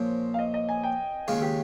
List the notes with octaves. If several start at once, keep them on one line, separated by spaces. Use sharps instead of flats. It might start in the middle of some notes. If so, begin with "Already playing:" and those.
Already playing: A#2 F3 A#3 C#4 C5 C#5
F5
D#5
D#5
G#5
G5
D#2 C#3 G#3 C#4 F4 F5
G4